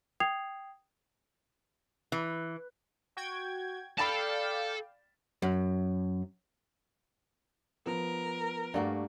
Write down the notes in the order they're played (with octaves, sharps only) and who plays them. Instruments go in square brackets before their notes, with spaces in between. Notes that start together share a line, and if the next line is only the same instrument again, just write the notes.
[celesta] G5 D#6 G#6 C7 F7
[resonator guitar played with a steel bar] E3
[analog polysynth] F#4 G5 G#6
[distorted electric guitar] A4 A5 [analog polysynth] D5 F5 G5 [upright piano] B5 A6 E7
[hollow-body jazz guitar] F#2
[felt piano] F3 B3 [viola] A#4
[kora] G2 A#3 F#4 [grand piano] A3 D5 F#5